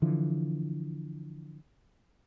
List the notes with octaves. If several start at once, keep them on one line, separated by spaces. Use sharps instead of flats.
D3 E3 F3